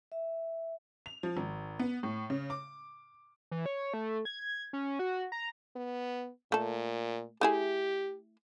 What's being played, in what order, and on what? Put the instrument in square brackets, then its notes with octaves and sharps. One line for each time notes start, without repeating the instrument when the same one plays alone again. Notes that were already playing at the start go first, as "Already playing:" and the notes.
[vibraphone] E5
[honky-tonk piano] F7
F3
G#1
B3
A2
C#3
D6
[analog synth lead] E3
C#5
A3
G#6
C#4
F#4
A#5
[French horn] B3
[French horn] A#2 [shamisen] A3 A4
[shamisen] A3 E4 G#4 [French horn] G4